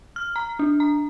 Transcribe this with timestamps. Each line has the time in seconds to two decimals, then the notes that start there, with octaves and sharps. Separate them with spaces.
0.16 F6
0.36 A#5
0.59 D4
0.80 A#5